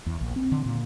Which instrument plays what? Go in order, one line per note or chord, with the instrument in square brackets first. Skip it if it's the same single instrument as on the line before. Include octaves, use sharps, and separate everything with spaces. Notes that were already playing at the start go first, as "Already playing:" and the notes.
[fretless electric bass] E2
A#1
C4
D3
A#2